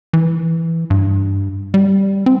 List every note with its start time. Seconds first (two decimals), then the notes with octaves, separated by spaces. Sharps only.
0.13 E3
0.90 G2
1.74 G3
2.26 C4